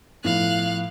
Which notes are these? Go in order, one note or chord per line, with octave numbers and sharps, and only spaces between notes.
A2 F3 B3 F5 F#6